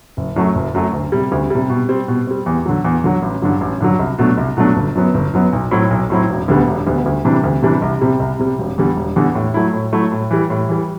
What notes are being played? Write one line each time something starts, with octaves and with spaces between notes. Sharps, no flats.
F#1
F#2 F#3 A3
F#1
F#2 F#3 A3
D2
C3 G3
D2
C3 G3
B2
G3 C4
B2
G3 C4
E2
D3 F#3
E2
D3 F#3
A1
G2 D3 F#3
A1
G2 D3 F#3
C2
B2 F#3 A3 D4
C2
B2 F#3 A3 D4
G1
F#2 F#3 B3
G1
F#2 F#3 B3
B1
A2 F#3 C4 E4
B1
A2 F#3 C4 E4
E1
D2 D3 G3 B3
E1
D2 D3 G3 B3
D2
C3 E3 G3 D4
D2
C3 E3 G3 D4
C2
C3 G3
C2
C3 G3
E1
E2 D3 G3
E1
E2 D3 G3
A2
F#3 A3 E4
A2
F#3 A3 E4
A2
E3 G3
A2
E3 G3